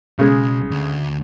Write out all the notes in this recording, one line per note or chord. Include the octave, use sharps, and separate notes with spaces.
B1 C#3 G#3
D2